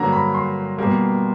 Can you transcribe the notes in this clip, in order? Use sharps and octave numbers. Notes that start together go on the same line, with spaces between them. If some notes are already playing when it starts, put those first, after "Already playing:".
Already playing: G2 D3 F#3 A#3 A#5
B5
C6
B2 G3 A#3